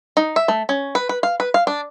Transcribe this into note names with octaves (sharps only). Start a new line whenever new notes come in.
D#4
E5
A3
C#4
B4
B4
F5
B4
F5
D4